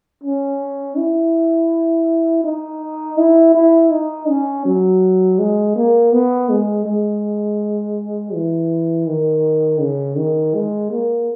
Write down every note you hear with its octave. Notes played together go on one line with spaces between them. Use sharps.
C#4
E4
D#4
E4
E4
D#4
C#4
F#3
G#3
A#3
B3
G#3
G#3
E3
D#3
C#3
D#3
G#3
A#3